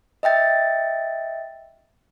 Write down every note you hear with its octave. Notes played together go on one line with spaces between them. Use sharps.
D#5 E5 G5 A6